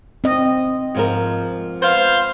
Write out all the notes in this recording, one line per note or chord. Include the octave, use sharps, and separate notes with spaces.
C4 D#5
G#2 F3 A#4
B3 C5 F5